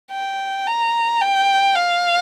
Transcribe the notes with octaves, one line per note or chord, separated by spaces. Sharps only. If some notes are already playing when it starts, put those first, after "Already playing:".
G5
A#5
G5
F5